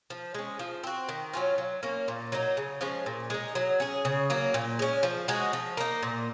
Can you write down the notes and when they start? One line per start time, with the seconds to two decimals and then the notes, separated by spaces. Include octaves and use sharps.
0.10 F3
0.34 G#3 C#4
0.59 F3
0.84 C4 F#4
1.09 D#3
1.33 F#3 C#4 F4
1.58 F#3
1.83 A#3 C#4
2.08 A#2
2.32 F#3 A#3 D#4
2.57 C#3
2.81 F3 G#3 C#4
3.06 A#2
3.30 G#3 D#4
3.55 F#3
3.80 C#4 G#4
4.05 C#3
4.30 F#3 A#3
4.54 A#2
4.79 G#3 C#4
5.03 F3
5.28 G#3 D#4 F#4
5.53 F3
5.77 A#3 D#4
6.03 A#2